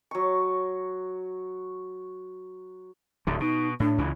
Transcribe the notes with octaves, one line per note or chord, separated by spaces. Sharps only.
F#3 C#6
D1 D2 D3
B2 D#4
A2 D4
C#2 C#3 E3